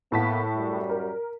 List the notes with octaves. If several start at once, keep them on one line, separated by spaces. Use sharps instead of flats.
A2 A#3 B3 A5 B6
F#2 G3
A#4